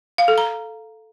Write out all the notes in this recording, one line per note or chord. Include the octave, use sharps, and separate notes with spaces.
F5
A4
A#5